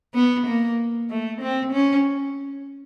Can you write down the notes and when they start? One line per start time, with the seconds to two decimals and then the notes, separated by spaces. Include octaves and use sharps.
0.15 B3
0.46 A#3
1.10 A3
1.41 C4
1.72 C#4